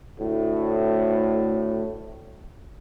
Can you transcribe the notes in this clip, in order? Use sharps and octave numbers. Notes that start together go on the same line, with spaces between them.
D2 A2